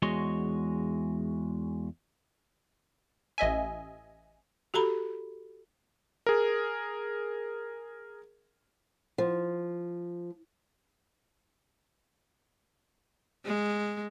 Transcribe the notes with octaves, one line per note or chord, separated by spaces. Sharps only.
E2 G#3 F#4 C#5 D#5 C6
A1 D#5 E5 G#5
F#4 G4 A4 A#5 B5
G#4 A#4
F3
G#3